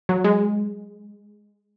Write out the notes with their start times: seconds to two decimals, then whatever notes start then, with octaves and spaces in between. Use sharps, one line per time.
0.09 F#3
0.24 G#3